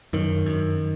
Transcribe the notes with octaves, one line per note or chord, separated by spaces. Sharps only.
F#2 D#3
F#2